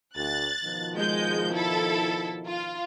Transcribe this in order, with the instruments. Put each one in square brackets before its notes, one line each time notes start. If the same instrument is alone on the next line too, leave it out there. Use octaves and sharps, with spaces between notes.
[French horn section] D2 [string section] F#6 A6
[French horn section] B2 D#3 F3
[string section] G#3 G6
E4 A4
F4